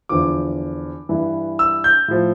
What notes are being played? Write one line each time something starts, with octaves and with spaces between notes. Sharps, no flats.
E2 D3 F3 D6
G2 E3
E6
G6
A2 F3